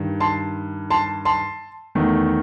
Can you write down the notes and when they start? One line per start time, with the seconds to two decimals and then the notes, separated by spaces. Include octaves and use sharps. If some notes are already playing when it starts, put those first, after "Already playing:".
Already playing: G2 D#3
0.20 A5 C6
0.90 A5 C6
1.25 A5 C6
1.95 E2 D#3 A3